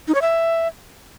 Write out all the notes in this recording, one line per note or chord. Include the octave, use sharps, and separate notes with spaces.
D#4
C#5
E5